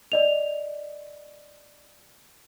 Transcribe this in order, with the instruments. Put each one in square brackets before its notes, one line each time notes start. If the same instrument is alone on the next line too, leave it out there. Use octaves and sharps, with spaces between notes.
[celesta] D5 D#5 F7